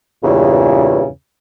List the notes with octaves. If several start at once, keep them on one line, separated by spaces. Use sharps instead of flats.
E2 G2 A#2 C#3